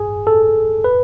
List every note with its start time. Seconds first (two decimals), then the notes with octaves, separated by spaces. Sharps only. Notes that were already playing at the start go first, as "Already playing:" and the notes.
Already playing: G#4
0.27 A4
0.84 B4